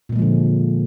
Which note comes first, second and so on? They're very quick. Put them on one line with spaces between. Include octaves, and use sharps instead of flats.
A#2 A#3 G#3 F3 D3